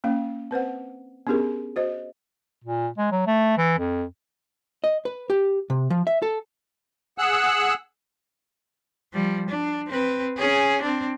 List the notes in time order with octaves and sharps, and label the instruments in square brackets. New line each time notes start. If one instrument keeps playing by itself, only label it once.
[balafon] A#3 C#4 F5
C4 B4 C5 F#5
B3 C#4 D4 G4 G#4 A#4
F#4 C5 D#5
[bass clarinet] A#2
G#3
F#3
A3
E3
F2
[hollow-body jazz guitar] D#5
B4
G4
C3
F3
E5
A4
[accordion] G#4 F#5 E6 F#6
[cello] F3 G3
D4
C4 B4
C#4 G#4
C4 D4